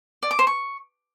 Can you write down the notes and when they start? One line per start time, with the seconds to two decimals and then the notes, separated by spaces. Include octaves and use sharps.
0.23 D5
0.31 D6
0.39 C5
0.47 C#6